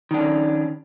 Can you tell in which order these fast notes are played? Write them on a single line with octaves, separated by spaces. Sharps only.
D#3 D4 C#4